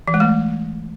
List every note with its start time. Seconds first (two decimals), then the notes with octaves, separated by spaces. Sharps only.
0.08 E3
0.14 G#3
0.20 A3